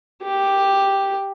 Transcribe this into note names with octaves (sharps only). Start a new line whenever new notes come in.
G4